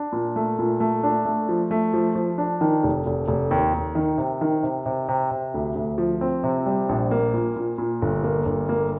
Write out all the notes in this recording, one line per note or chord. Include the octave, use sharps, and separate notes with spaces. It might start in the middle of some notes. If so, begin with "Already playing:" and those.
Already playing: D4
A#2
A3
A#2
A3
D4
A3
F3
A3
F3
F3
D4
D#3
F1
F1
F1
D#2
D#2
D#3
C3
D#3
C3
C3
C3
C3
D2
D2
F3
C4
C3
G3
A#1
A#3
A#2
A#2
A#2
G1
A#3
G1
A#3